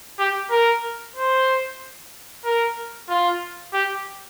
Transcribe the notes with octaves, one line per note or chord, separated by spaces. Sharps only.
G4
A#4
C5
A#4
F4
G4